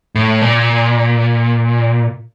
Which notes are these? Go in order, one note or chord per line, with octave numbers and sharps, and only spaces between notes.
A2
A#2